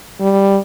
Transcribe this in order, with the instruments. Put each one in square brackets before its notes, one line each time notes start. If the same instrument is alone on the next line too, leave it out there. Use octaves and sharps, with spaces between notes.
[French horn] G3